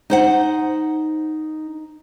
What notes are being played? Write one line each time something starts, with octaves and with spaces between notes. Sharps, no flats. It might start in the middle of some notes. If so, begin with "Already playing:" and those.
D#4 C5 F#5